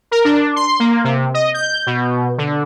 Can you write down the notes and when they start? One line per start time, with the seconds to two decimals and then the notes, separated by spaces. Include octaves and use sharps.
0.11 A#4
0.25 D4
0.56 C6
0.80 A#3
1.04 C3
1.34 D#5
1.54 G6
1.86 B2
2.38 D3